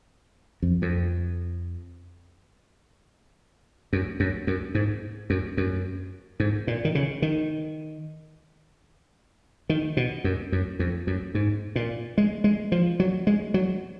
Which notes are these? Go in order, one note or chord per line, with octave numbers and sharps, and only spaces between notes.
F2
F2
F#2
F#2
F#2
G#2
F#2
F#2
G#2
A#2
D#3
C#3
D#3
D#3
B2
F#2
F#2
F2
F#2
G#2
A#2
G#3
G#3
F3
F#3
G#3
F#3